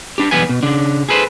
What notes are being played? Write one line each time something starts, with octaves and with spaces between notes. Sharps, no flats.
G3 D4 G4
B1 E2 G3 B3 B4 G#5
B2
C#3 D4
G#4 A4 B4 C5